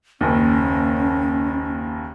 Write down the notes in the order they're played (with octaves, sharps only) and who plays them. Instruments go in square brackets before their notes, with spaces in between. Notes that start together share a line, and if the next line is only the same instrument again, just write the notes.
[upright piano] F#1 D#2 [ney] C#4